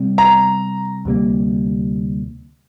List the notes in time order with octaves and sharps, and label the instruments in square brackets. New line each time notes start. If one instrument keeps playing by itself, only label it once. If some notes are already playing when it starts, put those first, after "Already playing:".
Already playing: [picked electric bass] C3 G3 C4
[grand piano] A#5
[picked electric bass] D2 C3 G3 A#3